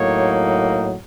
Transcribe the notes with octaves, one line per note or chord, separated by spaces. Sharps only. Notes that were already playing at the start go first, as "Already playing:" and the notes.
Already playing: A2 F#3 A#3 D#4 C#5